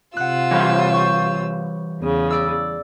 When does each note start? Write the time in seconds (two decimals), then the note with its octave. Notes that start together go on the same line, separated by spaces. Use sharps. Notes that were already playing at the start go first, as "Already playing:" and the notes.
0.17 C3 F4 F#5 E6 F#6
0.51 E3 G3 C#5 F5
0.93 C#6 G6
2.00 E2 C#3
2.30 D5 E6